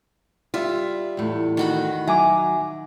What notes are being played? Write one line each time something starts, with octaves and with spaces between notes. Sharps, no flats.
G3 F4 E5
E2 A2
D#3 F#4 B5
F#3 E5 G#5 A#5 D6